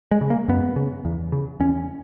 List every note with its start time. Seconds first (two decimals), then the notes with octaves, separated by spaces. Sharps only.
0.11 G#3
0.21 C#3
0.30 A#3
0.48 F#2 B3
0.76 C#3
1.05 E2
1.32 C#3
1.60 E2 C#4